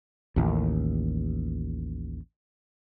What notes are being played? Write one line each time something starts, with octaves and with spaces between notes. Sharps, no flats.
A1 D#2